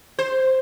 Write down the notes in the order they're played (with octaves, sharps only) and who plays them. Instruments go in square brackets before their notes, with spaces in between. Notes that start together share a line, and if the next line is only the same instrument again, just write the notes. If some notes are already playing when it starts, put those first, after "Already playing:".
[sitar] C5